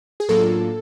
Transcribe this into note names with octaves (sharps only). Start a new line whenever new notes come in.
G#4
A2 F#3 A#3 D4 F4 A4